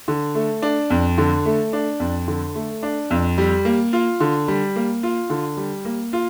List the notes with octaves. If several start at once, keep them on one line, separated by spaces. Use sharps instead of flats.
D3
A3
D4
F2
D3
A3
D4
F2
D3
A3
D4
F2
G3
A#3
F4
D3
G3
A#3
F4
D3
G3
A#3
F4